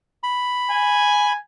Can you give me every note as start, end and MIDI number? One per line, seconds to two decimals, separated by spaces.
0.23 1.33 83
0.71 1.38 80